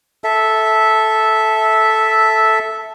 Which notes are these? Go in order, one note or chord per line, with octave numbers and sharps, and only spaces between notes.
A4 E5